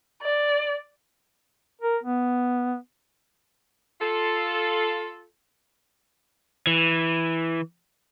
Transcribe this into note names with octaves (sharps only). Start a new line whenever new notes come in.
D5
A#4
B3
F4 A4
E3